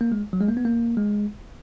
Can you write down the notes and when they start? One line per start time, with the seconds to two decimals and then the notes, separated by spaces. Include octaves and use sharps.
0.01 A#3
0.12 G#3
0.33 F#3
0.41 G#3
0.48 A#3
0.57 B3
0.65 A#3
0.97 G#3